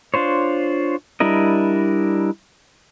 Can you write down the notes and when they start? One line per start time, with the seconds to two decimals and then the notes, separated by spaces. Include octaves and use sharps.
0.14 D4 F4 C5 C#5
1.20 G3 D4 E4 A#4 D#5